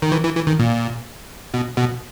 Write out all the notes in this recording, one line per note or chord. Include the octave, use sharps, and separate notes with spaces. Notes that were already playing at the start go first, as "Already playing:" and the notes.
D#3
E3
E3
E3
D#3
A#2
B2
B2